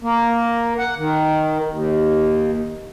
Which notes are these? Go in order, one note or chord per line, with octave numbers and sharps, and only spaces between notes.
A#3
F#5
D#3
D#2